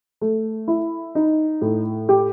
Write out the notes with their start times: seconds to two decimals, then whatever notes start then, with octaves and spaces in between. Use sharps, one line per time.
0.21 A3
0.68 E4
1.15 D#4
1.61 A2
2.09 G4